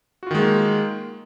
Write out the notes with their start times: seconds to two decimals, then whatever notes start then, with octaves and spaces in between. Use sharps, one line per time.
0.23 F#4
0.27 F4
0.31 D#3
0.35 G#3
0.39 A#3